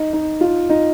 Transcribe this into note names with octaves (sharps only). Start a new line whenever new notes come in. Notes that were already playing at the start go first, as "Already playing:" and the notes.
Already playing: D#4
D#4
F4
D#4